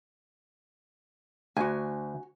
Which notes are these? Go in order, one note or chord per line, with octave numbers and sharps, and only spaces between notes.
D2 F#4 G#5